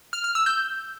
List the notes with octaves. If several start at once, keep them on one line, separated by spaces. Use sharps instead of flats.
F6
F6
E6
G6